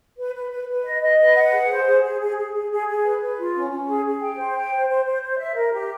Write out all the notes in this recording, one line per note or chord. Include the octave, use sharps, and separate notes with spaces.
B4
B4
B4
B4
D#5
D#5
B4
F#5
G#4
C5
G#4
G#4
G#4
G#4
G#4
G#4
G#4
B4
B4
F4
C#4
C#4
G#4
G#4
G5
C5
G5
C5
C5
C5
C5
E5
A#4
G4